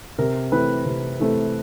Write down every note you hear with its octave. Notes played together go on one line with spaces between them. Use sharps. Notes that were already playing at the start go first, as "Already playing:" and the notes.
C3 A#4
E3 A3 C4 B4
C3
E3 A3 C4